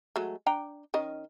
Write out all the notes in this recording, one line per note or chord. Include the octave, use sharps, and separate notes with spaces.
F#3 G#3 A3
D4 G5 A#5
D#3 C#4 D#5